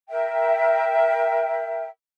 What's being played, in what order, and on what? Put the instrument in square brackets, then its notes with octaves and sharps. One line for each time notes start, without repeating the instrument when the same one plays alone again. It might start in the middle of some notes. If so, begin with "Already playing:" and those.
[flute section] A#4 E5 G5